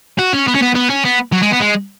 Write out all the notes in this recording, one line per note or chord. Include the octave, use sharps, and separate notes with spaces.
F#4
C#4
B3
C#4
B3
B3
C#4
B3
F#3
G#3
B3
G#3